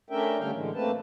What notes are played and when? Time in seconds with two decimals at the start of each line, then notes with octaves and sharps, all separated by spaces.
0.10 A3 C#4 D4 A#4 E5 G5
0.39 D3 G3 A3 C#4 F5 G5
0.51 A2 D3 E3 G#3
0.74 A3 A#3 C4 B4 A5